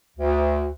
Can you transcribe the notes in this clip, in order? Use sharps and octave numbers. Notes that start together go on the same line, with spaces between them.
D2